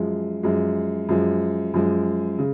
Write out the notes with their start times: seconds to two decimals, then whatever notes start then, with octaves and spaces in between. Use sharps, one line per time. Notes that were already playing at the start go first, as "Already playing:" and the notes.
Already playing: F#2 F3 G#3
0.43 F#2 F3 G#3
1.09 F#2 F3 G#3
1.74 F#2 F3 G#3
2.39 C#3